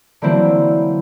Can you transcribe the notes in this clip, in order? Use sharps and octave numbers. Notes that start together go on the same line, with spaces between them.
D3 E3 F#3 A#3 C4 E4